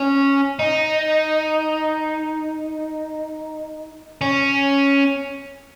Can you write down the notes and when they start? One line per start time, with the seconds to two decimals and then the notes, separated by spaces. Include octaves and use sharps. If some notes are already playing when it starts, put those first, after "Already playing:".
Already playing: C#4
0.59 D#4
4.21 C#4